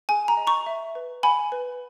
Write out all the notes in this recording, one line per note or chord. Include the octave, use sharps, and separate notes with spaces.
G#4 G#5
A#5
D#5
A#5 C#6
E5
B4
F#5 G#5 B5
B4